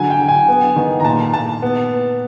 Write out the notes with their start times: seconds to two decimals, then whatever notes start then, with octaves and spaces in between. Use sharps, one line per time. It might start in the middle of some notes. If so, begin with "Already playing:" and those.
Already playing: D3 F#3 G#5
0.10 G5
0.19 D3
0.28 G#5
0.48 B3
0.76 D#3
1.00 A#5
1.05 A#2 A5
1.34 A#2 A5
1.62 B3